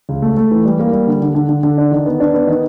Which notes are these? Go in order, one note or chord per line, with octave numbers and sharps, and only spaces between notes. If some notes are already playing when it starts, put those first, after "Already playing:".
C#2
A3
A3
E3
G3
A#3
G3
D3
D3
D3
D3
D3
D4
D#3
B3
D4
B3
D#3